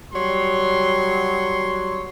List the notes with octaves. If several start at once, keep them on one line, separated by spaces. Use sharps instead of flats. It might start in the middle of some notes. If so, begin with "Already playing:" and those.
F#3 G3 C#5 C6